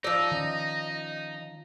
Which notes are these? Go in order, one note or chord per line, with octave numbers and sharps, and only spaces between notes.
F3 D#4 D5 E6
D#3 C#4 D#5